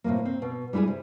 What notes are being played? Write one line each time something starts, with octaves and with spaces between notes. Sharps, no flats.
A2 C3 F3 G#3 A#3
C4
B2
G3 G#3 E4 F#4 G#4
C3